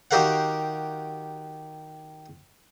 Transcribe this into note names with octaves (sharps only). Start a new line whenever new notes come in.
D#3 F#4 G4 A#4 F5 F#5